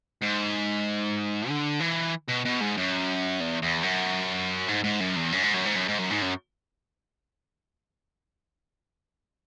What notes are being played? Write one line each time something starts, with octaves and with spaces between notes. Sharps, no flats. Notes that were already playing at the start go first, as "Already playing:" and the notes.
G#2
D3
E3
B2
B2
G#2
F#2
E2
E2
F#2
G#2
G#2
F#2
E2
F#2
G#2
F#2
G#2
F#2
G#2
F#2
G#2
F#2